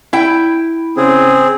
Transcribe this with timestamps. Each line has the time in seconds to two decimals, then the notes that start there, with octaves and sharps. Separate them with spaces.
0.13 E4 G5
0.97 C#3 C4 G#4